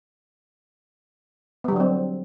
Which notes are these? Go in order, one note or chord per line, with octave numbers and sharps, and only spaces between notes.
D3 F#3 G3 B3 C4